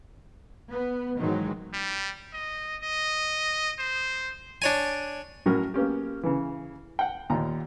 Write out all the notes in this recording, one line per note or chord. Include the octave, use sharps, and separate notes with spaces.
B3
G#2 D#3 E3 F#3 G#3
G3
D#5
D#5
C5
D4 C#5 G#5
A2 F#3 C#4 A#4
A#3 B3 C#4 G4
C#3 E3
F#5 G5
D#2 A#2 A#5